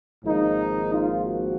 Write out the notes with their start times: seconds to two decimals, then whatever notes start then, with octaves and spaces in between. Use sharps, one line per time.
0.24 G#1 G#2 F3 A#3 D#4
0.91 F4
1.24 F#4